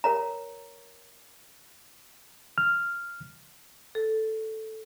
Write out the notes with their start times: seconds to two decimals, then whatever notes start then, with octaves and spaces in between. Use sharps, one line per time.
0.04 A#4 C#5 A#5
2.58 F6
3.95 A4